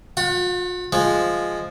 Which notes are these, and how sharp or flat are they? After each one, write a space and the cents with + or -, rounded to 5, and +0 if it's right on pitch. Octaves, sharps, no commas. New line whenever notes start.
F4 +45 F#5 +0
F3 +0 G#3 +0